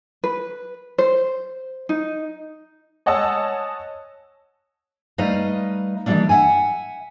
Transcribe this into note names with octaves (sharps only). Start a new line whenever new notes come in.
B4
C5
D#4
C#5 D#5 F#5 G#5 A5 E6
G3 A3 D#4 B4 D#5 F5
D#3 E3 G3 A#3 C#4 D4
E5 F#5 G#5